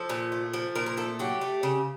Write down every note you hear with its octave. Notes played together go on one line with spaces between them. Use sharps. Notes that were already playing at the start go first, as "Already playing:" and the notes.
Already playing: F3 A4
A#2
A3
F3
A#2 A#4
A#4
A3 A4
F#3 G4
A3
C#3